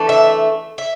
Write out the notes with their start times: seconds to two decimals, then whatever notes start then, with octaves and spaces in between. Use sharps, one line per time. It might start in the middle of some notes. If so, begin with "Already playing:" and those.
Already playing: E3 A3 D4
0.09 E5
0.78 E5